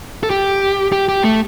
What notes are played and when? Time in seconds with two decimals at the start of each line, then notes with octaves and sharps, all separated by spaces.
0.23 A4
0.30 G4
0.92 G4
1.09 G4
1.24 A3